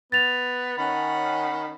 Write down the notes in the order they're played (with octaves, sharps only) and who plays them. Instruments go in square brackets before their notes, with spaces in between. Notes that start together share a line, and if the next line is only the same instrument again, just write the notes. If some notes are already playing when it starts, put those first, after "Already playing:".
[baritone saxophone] B3 [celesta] A6 F7
[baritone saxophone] D#3 [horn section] C#4 F#5 [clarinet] B5